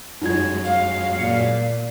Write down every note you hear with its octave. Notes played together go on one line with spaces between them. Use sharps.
F#2 F#3 G#3 D#4 F4 G#6
F5
A#2 C#7